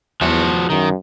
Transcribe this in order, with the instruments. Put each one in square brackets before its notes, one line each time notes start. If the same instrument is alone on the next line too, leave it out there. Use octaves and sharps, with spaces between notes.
[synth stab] E2 [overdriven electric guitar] F3 F#4
[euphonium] F#2 [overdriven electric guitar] D#3